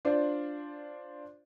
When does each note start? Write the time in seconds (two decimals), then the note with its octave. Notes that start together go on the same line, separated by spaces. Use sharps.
0.05 D4 F4 C5 D5